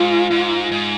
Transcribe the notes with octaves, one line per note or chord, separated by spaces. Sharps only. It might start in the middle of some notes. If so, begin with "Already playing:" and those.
Already playing: G#2 F4
G#2
G#2